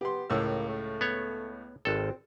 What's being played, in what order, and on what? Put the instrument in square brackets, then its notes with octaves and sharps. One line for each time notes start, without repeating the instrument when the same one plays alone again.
[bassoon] B3 [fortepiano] G4 C6
[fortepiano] C#2 A2 E6 [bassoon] A#3
[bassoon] A3
[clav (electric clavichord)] B3 C#5
[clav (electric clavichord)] G#1 A4 [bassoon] C4